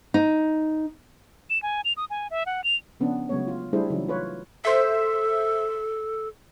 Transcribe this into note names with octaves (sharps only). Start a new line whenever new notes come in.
D#4
E7
G#5
F7
D#6
G#5
E5
F#5
F7
C#3 F3 B3 C#4 D4
C#3 F#3 G#3 A3 B3 C#5
F4
G3 A3 D4 E4 G#4 C5
C#3 E3 F#3 D#4
A3 F4 B4 C#5
A4 C5 E5